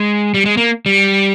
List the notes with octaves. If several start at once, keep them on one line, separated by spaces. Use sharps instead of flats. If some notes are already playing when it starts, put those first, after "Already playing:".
Already playing: G#3
G3
G#3
A#3
G3